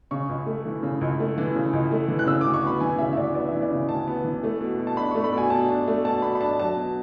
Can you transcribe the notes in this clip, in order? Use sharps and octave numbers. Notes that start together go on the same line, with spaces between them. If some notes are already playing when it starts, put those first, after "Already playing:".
C#3 C#6
C#2
A3
E3
C#3
C#2
A3
E3
C#3
C#2
A3
E3
F#6
C#3 E6
D6
D2
C#6
B3 B5
E3 G#5
C#3 E5
E5
D2 D5
B3 D5
E3 E5
D5
C#3
D2 A5
B3
E3
A3
B2
B2
A5
D4 B5
C#6
A3
B5
B2 G#5
B2 A5
D4
A3
B2 A5
B2 B5
B5
D4 A5
F#3 A5
B2